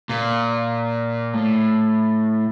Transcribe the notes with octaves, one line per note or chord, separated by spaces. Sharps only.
A#2
A2